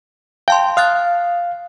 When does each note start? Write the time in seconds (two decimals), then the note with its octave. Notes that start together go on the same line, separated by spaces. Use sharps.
0.48 F5 G5 A5 C6
0.77 F5 D#6 F#6 A6